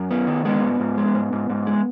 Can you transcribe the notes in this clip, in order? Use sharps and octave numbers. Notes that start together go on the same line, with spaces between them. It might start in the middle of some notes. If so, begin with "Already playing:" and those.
Already playing: F#2
B3
D#3
G#3 B3
G#2
G#2
G#3
G#2
G#2
G#2
G#3